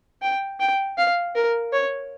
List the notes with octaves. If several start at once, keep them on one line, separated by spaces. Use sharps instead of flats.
G5
G5
F5
A#4
C#5